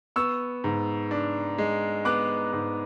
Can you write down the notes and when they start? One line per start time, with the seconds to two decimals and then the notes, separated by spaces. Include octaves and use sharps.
0.16 B3 C#6 E6
0.64 G#2
1.11 D4
1.58 G#3
2.05 B3 D6 F#6
2.53 G#2